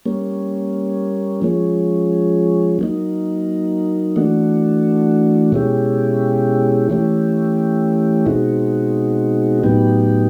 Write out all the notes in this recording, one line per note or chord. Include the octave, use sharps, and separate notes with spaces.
G3 A#3 C#4
F3 G#3 C#4
F#3 A#3 D#4
E3 A3 D4 F#4
B2 G#3 C#4 E4 G4
E3 A3 C#4 E4 G4
B2 G#3 C4 D#4 F#4
A2 F#3 B3 D#4 G4